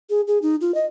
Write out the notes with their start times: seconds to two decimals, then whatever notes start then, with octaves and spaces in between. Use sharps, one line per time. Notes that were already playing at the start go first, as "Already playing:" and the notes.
0.10 G#4
0.28 G#4
0.42 D#4
0.61 F4
0.75 D#5